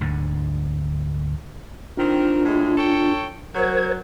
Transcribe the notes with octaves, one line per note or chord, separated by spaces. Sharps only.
D2 G#2 D3
D#3 C4 D4 F4 A#4
A2 G#3
A4 C#5 G5
F#3 A#4 C5 G#6